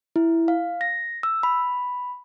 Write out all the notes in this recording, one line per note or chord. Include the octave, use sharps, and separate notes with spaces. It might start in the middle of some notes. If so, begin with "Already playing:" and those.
E4
F5
A#6
E6
B5